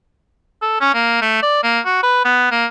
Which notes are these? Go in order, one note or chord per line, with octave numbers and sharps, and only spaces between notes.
A4
C#4
A#3
A3
D5
A#3
F#4
B4
B3
A#3